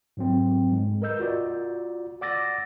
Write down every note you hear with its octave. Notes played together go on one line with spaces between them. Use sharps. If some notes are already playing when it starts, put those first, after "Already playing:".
G#2 F#3 C4
G#2 G#3
A#4 B4 D#5 E6 G6
F4 F#4 D5
D5 F#5 D6 E6 A6 A#6